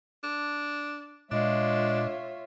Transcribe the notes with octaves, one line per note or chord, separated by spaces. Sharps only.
D4
A#2 G#3 D4 F4 C#5 E5